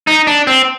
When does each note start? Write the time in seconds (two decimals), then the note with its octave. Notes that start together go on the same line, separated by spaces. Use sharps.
0.07 D#4
0.27 D4
0.47 C4